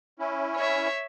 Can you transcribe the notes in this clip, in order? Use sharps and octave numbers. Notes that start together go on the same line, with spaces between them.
C#4 E4
C#5 E5